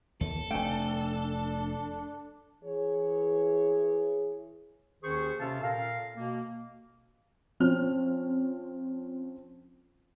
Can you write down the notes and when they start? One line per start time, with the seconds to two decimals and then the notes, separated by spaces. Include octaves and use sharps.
0.21 D#2 A4
0.51 F1 A3 D4 G5 G#5
2.64 E3 G#4 C#5
5.03 D#2 D#3 C#4 G#4 C5 C#6
5.39 C3 C#4 F4 A4 F5 A5
5.61 A#2 A4 A#4 F5
6.15 B2 A#3
7.60 F3 C4 C#4 F6 F7